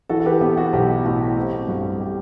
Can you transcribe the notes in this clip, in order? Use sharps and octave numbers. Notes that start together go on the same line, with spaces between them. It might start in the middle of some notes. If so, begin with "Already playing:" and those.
E3 F#4 A4
A4
G4 B4
B3 G4
F#4
B1 G4
A2 F#4
C4 G4
G2 F#4
G4